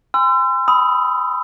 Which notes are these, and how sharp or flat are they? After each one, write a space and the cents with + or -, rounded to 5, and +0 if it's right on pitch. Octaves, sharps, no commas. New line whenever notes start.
G#5 -40 C6 -35 E6 +35
B5 +15 D#6 +25